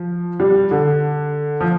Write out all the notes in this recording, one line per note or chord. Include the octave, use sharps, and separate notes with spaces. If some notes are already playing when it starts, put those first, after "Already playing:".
Already playing: F3
G3
D3
F3